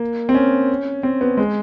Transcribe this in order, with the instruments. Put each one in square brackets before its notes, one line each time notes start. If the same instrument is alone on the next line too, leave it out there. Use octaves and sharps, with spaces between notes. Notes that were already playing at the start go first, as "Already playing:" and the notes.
Already playing: [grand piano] A#3
C4
C#4
C4
B3
G#3